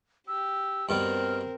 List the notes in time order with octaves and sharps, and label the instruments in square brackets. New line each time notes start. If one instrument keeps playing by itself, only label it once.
[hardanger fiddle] G4 [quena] E6
[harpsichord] G2 B2 G3 [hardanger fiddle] C4 A#4 [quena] F6